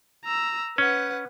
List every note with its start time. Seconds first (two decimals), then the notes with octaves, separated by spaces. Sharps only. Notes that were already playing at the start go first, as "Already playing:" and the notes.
0.25 A#5 E6
0.78 C#4 B4 F#5